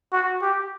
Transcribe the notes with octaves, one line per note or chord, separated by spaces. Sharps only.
F#4
G4